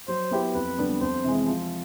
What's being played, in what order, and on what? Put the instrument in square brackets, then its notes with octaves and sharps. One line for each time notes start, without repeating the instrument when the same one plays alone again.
[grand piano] F#3 [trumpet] C5
[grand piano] B3 E4 G4
[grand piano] F2 [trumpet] B4
[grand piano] D3 G3 B3 D4
[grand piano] F2 [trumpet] C5
[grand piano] C3 E3 G#3
F3